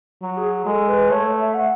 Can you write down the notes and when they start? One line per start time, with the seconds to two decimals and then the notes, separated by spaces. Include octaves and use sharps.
0.22 F#3 F#4
0.37 G#4
0.66 G#3 A4
0.88 B4
1.10 A3 C#5
1.40 E5
1.54 F#5